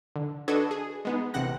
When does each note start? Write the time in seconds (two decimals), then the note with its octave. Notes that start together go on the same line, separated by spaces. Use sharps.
0.16 D3
0.48 D4 F#4 A4 B4 D#5 G#6
0.71 G#4
1.05 G#3 B3 D#4
1.34 A1 C3 C4 F#5 F#6 A#6